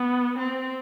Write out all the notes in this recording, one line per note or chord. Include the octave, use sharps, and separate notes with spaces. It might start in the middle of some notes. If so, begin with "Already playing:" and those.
Already playing: B3
C4